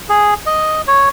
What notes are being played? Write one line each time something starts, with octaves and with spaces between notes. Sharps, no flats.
G#4
D#5
C#5